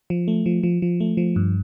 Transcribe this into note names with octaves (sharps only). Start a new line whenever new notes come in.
F3
A3
F3
F3
F3
A3
F3
G2